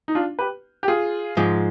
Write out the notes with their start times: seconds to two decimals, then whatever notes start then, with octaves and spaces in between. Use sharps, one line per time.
0.08 D#4
0.15 D4 F4
0.39 G4 B4
0.83 G4
0.88 F4 G#4
1.37 G#2 F3 G#3